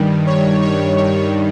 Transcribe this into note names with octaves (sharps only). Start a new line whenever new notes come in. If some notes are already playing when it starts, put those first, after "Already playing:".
Already playing: G2 D#3 G3
C#5
C#5
C#5